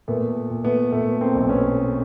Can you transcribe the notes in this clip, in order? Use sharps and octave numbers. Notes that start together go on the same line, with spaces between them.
A#2 A3 B3
A#2
A3 B3
A#2 A3 B3
A#3 C4
B1
B3 C#4